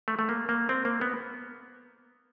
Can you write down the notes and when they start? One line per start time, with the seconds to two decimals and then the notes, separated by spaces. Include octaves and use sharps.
0.08 A3
0.19 A3
0.29 A#3
0.49 A#3
0.69 C4
0.85 A#3
1.01 B3